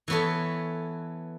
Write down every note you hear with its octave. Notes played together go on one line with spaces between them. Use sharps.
E3 B3 A4 C#5